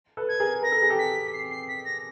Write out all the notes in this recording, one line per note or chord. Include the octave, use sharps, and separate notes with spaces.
A4 B4
G#6
G#4 A#4
A#4 A#6
A4
G#4
G4 A4
B6
B6
C7
C7
B6
A#6